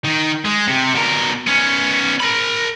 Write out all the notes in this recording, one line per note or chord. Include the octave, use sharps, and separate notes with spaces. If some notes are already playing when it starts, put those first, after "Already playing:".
D#3
G#3
C3
B2 A#4
B3 C#4
A#4 B5